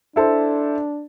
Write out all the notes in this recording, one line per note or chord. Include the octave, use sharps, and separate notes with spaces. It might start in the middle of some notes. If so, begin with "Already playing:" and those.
D4 E4 A4 C5